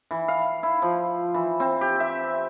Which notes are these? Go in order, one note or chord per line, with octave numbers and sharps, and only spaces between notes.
E3
F5
E4
F3
E3
C4
G4
E5